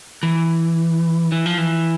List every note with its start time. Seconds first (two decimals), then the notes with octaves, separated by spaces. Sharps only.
0.23 E3
1.32 E3
1.46 F3
1.58 E3